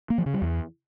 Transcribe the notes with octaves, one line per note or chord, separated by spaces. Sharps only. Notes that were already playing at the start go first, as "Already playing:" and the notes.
A#3
F3
C#3
G3
E2